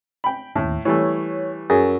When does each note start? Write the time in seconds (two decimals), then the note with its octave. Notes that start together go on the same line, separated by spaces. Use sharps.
0.24 G5 B5
0.56 D#2 A2
0.85 E3 G3 A3 C#5
1.70 F#2 G#4